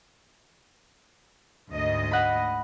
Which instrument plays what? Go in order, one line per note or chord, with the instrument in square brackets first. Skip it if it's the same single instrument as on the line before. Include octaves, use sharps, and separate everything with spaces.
[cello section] D2 G#2 D#5
[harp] F#5 B5